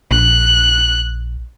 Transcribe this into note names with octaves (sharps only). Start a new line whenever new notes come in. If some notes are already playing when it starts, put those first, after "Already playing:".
A#1 F#6